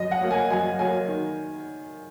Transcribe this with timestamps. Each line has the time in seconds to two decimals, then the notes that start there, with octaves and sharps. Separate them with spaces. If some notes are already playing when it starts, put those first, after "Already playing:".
Already playing: F#2 D#5
0.11 F#5
0.21 F#3 A#3
0.31 G#5
0.50 F#2 G#5
0.79 F#3 A#3 G#5
1.08 D#3